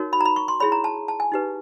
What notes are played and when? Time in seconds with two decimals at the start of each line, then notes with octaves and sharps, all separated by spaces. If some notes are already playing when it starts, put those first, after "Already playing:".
Already playing: D#4 F#4 A#4 C#5
0.13 B5
0.21 A#5
0.25 B5
0.36 C#6
0.48 C6
0.60 E4 G#4 C#5 B5
0.72 A#5
0.84 A5
1.08 A5
1.20 G#5
1.32 D#4 G4 B4